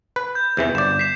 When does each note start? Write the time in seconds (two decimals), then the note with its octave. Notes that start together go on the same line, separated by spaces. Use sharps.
0.16 B4
0.35 G6
0.57 E2 C3 E3
0.75 G1 D5 E7
0.99 B6 C7 E7